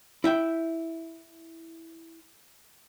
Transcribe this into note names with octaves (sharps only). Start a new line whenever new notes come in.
E4 E5 G5